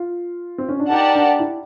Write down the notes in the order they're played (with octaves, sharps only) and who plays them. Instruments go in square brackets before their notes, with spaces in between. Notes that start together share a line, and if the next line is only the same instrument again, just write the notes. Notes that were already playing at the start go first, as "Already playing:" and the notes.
Already playing: [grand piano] F4
C4
C#4
D4
[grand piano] D#4 [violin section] G4 A#4 D5 F#5 A5
[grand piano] D4
E4